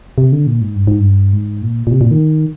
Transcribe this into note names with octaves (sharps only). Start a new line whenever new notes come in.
C3
D3
A#2
G#2
G2
G#2
G2
G#2
A#2
A#2
C3
A#2
D#3